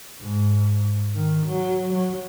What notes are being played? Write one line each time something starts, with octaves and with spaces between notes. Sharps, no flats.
G#2
D#3
F#3
F#3